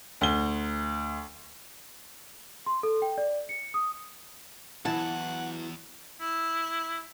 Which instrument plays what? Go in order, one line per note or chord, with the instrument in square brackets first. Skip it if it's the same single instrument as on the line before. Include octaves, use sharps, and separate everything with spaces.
[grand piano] D2 G7
[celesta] C6
A4
G5
D5
C#7
D#6
[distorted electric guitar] E2 [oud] E3 F#3 E4 [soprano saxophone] F#5 [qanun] A5
[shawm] E4